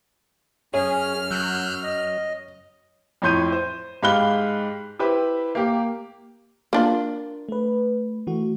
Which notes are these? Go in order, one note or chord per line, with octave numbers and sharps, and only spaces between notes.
F#2 C#4 G#4 C#5 F6
F#3 E6 F#6 G6
D#5
F2 A2 C#5 C6 G6 D#7
C5
G#2 G4 F5 B5 F#6 G7
E4 G4 B4 C5
A#3 G4
A#3 D4 F4 A#4
A3 B4
E3 A3 F#4